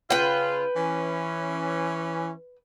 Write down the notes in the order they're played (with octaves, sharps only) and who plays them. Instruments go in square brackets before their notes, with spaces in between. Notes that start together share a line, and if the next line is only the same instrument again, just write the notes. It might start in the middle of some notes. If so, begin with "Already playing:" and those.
[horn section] C#3 F4 [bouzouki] B4 G5
[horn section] E3 C#4